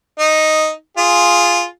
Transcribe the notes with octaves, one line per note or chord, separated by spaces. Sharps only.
D#4
F4 G#4